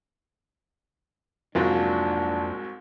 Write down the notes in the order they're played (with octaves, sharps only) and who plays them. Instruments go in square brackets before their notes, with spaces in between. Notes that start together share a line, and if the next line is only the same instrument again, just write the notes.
[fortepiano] C2 G#2 F#3 [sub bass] F2 [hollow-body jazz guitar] A#3 F4 [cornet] D4